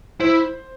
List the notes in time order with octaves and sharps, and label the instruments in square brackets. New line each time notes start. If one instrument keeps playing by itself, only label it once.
[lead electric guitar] E4 [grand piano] C5